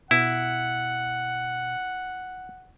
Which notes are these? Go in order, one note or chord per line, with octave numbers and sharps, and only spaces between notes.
B2 E4 F#5